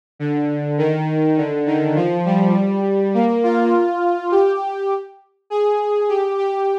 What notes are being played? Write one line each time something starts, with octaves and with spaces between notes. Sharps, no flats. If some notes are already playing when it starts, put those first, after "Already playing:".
D3
D#3
D3
D#3
F3
G3
A#3
F4
G4
G#4
G4
G4